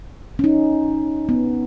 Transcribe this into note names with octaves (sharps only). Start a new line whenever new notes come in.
C#4
D#4
B3